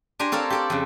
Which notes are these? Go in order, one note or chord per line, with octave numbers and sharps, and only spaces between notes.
D4 G4 C5 G#5 A#5
C4 A4 A#4 C#5 F5
G4 A4 D5
F2 C#3